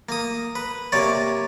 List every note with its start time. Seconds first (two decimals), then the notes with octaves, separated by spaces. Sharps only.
0.09 A#3 D#6
0.55 B4
0.92 C3 A#3 C#5 D5